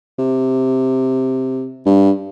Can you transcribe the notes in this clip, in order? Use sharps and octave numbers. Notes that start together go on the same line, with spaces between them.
C3
G2